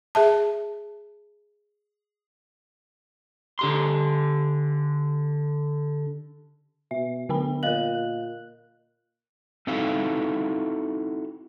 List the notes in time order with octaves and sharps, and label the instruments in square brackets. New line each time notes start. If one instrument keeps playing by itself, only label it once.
[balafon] G#4 E5 A5
[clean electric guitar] D3 G4 C6
[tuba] B2 [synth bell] E5
[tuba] D2 [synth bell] D3 B3 B5
[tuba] A#2 [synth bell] A#4 F#6 [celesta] D#5 F5 F#7
[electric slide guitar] C4 D#4 E4 F#4 A4 F5